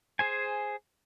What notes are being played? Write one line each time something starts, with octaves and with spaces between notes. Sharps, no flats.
G#4 C5 G#5